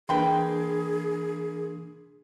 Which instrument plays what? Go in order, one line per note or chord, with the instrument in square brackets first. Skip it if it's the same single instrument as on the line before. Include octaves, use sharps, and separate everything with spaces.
[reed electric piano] E3 D4 [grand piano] A#3 B5 C6 [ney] G#4 [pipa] B4 G5